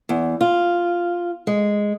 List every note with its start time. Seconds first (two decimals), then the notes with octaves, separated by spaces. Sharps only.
0.09 E2
0.41 F4
1.47 G#3